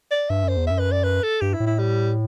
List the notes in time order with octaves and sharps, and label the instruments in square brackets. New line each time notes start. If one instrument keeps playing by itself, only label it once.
[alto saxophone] D5
[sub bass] G2 [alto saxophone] E5
[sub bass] F#2 [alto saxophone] C5
[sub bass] E2
[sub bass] F#2 [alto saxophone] E5
[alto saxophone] B4
D5
B4
A4
[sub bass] G2 [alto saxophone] G4
[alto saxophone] E4
[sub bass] A2
[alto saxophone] E4
G3